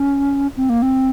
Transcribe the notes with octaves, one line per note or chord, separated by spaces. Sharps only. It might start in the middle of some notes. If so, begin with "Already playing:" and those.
Already playing: C#4
C4
A#3
C4